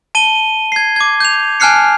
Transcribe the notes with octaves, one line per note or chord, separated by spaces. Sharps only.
A5 D#7 G7
G#6 C7
D6 G#6
G6 F7
G#5 A5 F6 F#6 C7 C#7